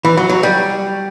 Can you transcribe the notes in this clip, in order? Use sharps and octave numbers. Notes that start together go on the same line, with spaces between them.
E3
F#3
F#3
G3